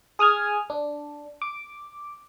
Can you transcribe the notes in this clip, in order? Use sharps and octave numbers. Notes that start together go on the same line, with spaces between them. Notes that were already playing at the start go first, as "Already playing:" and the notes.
G#4 D#6 F6 G#6
D4
D6